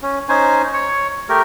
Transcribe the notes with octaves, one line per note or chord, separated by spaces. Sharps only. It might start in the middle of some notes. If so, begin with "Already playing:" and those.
C#4
C#4 D#4 C5 G#5
C#5
A3 G4 A#4